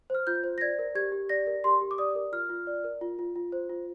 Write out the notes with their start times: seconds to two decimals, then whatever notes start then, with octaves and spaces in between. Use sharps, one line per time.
0.10 C5 F6
0.27 F4 G6
0.44 C5
0.58 A#6
0.61 D5 G#6
0.79 A#4
0.95 G4 G#6
1.12 G4
1.29 D5 A#6
1.47 A#4
1.64 G4 C6
1.81 G4
1.91 D6
1.98 D5 D#6
2.15 A#4
2.32 F4 F6
2.50 F4
2.67 D5
2.84 A#4
3.01 F4
3.19 F4
3.36 F4
3.52 C5
3.70 F4